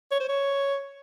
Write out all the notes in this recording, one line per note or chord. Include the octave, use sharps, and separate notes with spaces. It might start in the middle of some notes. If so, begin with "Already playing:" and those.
C#5
C5
C#5